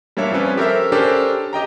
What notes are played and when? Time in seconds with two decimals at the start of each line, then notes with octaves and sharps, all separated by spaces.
0.17 G3 A#3 D4 C#5 E5
0.31 F3 G3 C4 C#4 B4
0.57 G4 A4 A#4 C5 C#5 E5
0.92 C#4 D4 G4 A4 A#4 C5
1.53 G4 D#5 G5 A#5